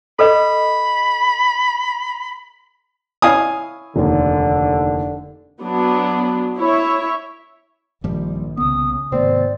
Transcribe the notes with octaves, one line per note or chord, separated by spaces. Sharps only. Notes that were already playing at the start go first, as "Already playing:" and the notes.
A4 B4 D#5 B5
E4 C#5 E5 F5 G#5 D#6
F1 D#2 D3
F#3 B3 D4
E4 C#5 E5
A#1 G2 D#3 F3 G3
C2 C#3 B3 D#6
G#1 C3 A3 B3 C4 D5